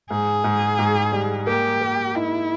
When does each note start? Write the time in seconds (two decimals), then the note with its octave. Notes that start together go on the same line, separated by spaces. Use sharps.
0.10 G#2 G#4
0.44 G#2
0.79 G#2
1.12 G3
1.47 A#3 G4
1.81 A#3
2.15 D#4 E4